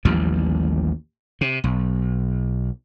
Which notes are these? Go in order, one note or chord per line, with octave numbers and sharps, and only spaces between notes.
A1 D#2 F3 G3
C3
B1